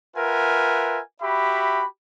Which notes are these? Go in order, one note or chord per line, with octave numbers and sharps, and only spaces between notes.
F4 A#4 B4 E5 F#5 G#5
F#4 G4 E5 B5